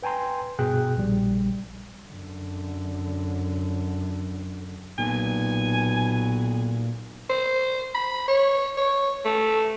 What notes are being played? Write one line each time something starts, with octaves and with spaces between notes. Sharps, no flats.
B4 G5 G#5 A#5 C6
G2 B2 B3 G#4 G5 F#6
A#1 G3
F#2 D3
B1 A#2 G#5
C5
B5
C#5
C#5
A3